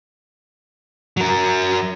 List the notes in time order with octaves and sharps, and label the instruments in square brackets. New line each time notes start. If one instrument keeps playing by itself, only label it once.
[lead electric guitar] F#3 A#4